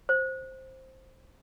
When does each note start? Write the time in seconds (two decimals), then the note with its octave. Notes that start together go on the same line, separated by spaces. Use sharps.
0.09 C5